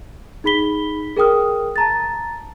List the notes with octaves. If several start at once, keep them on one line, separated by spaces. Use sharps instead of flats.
D#4 G#4 B5 B6 G7
G#4 A#4 G5 D#6 F6
A5 A#5 A6